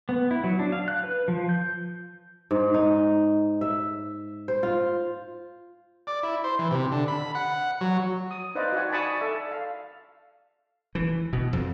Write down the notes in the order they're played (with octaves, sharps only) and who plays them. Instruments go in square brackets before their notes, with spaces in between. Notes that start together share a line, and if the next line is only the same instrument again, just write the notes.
[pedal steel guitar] B3
E4
F#3
D4
F5
F#6
B4
F3
G6
[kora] G#2
D#4
E5
C5
F4
[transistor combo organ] D5
E4
C5
E3
C3
D3
B5
F#5
F#3
[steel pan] D#6
D#4 B4 C5 D5 D#5 F5
F#4 D5 F#5 G#5
D5 G#5 A5 B5 C#6 D#6
A4 D5 E5
F5
[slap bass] E3
B2
F2